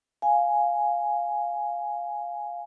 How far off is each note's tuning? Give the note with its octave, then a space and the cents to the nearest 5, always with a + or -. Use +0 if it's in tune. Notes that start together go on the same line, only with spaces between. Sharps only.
F5 +0 G#5 +0